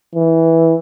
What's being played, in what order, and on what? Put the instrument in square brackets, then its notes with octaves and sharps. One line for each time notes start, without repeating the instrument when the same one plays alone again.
[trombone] E3